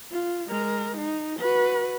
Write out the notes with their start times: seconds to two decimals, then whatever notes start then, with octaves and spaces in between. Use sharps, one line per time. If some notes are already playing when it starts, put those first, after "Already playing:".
0.11 F4
0.48 G#3 A#4
0.97 D#4
1.40 F#4 B4